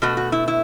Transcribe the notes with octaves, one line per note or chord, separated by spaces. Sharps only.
B2 A3 F#4
F#4
E4
E4